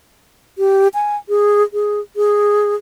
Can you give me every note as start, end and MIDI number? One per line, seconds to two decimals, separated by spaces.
0.58 0.88 67
0.94 1.16 80
1.29 1.63 68
1.73 2.00 68
2.16 2.75 68